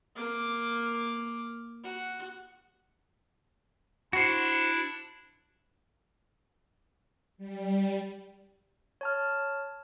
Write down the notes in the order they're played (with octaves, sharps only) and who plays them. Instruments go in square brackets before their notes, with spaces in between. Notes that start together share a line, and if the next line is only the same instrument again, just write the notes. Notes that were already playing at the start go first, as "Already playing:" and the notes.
[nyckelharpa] A#3 D6
F#4
[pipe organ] D4 E4 [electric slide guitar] F#4 C5
[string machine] G3
[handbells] C#5 A5 F6